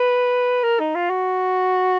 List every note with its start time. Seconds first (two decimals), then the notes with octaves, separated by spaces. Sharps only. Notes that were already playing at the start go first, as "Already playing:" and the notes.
Already playing: B4
0.63 A#4
0.80 D#4
0.95 F4
1.10 F#4